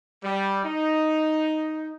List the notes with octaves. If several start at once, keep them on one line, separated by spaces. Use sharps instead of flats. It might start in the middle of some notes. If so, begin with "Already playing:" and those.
G3
D#4